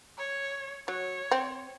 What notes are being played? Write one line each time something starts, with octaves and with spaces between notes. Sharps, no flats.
C#5
F#3 C#5
C4